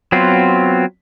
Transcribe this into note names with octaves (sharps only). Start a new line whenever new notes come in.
F#3 B3 C4 F4